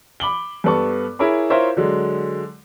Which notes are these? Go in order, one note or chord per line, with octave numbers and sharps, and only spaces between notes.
B5 D6 F#7 G7
G2 B3 A4 B4 A5 C#6
E4 G#4 A#4 C#5 B5
E4 F4 A#4 C5 C#5 E5
D3 F#3 G#3